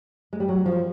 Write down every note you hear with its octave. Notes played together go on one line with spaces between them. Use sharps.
G#3
G3
F#3
F3